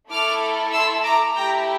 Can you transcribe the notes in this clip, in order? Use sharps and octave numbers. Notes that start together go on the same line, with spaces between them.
A3 E4 A4 D6 F6
C6 E6
A#5 D6
A3 E4 G4 G5 A#5